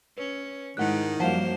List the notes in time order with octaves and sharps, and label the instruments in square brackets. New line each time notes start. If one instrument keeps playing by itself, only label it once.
[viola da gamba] C#4 [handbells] B4
[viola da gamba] G#2 G#3 [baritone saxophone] D#3 [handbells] E4 F#5 F#6
[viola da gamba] F#2 A#3 C5 [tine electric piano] F3 G3 F5 [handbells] F#5 A5